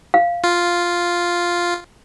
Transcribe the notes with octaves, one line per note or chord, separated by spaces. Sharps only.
F5
F4